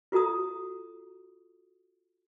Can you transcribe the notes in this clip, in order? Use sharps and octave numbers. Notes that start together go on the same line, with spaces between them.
F4 F#4 A4 A#5 D#6